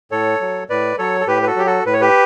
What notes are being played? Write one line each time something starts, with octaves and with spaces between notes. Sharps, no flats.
A2 A4 C#5
F#3
A2 B4 D5
F#3 A4 C#5
A4
A2 G4 B4
B4
F#4 A4
F#3 G4
F#4 A4
A2 B4
C#5
G4 B4